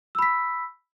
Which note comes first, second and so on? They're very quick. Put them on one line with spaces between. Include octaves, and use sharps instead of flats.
E6 B5 B6